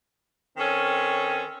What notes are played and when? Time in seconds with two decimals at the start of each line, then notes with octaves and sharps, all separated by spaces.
0.57 D#3 C4 C#4 A4 C#5